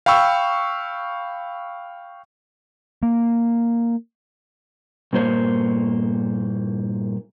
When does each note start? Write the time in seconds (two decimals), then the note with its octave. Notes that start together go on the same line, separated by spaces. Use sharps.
0.06 F5 G5 B5 C#6 E6
3.03 A#3
5.13 G2 A#2 A#3 C5 C#5